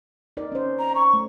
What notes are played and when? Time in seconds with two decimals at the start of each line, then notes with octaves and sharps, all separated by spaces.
0.37 D#4 A#4 D5
0.52 C#4 C5
0.79 A#5
0.95 C#6
1.14 A3